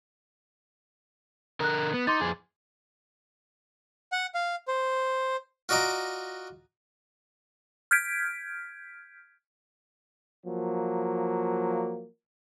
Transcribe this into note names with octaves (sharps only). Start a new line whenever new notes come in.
D3 A#4 D#6 F#6
B3
D#4 C6 D6 A6
F2 G#4
F#5
F5
C5
F4 F#4 D5 D#5 A#5 D6
F6 G6 G#6 B6 D7
F3 F#3 A#3